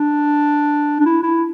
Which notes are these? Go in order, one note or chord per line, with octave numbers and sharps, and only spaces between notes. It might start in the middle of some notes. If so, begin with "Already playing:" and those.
Already playing: D4
D4
E4
E4